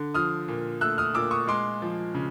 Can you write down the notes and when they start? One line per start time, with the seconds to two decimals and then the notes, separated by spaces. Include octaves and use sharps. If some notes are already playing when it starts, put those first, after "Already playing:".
Already playing: D3
0.14 F3 D#6 F6
0.48 A#2
0.81 A3 E6 F#6
0.98 D#6 F6
1.14 A#2 D6 E6
1.31 C#6 D#6
1.48 G#3 C6 D6
1.82 F3
2.14 C#3